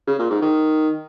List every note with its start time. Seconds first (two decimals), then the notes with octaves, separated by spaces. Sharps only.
0.07 C#3
0.19 A#2
0.30 G#2
0.42 D#3